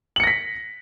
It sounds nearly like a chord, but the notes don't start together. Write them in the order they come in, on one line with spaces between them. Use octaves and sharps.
F#7 C#7 A#6 B6